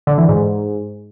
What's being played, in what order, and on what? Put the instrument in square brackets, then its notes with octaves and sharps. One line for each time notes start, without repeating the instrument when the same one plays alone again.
[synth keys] D3
E3
G#2